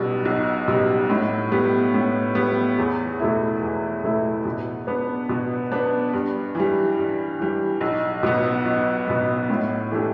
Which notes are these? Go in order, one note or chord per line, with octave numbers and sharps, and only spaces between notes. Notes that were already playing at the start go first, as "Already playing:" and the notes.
Already playing: B1 B2 G3
B1
B2 G3
A2
G3 B3
A2
G3 B3
E2
B2 A3 E4
E2
B2 A3 E4
B2
B3 D4 B4
B2
B3 D4 B4
G2
E3 G3
G2
E3 G3
B1
B2 B3
B1
B2 B3
A2
E3 A3 D4 G4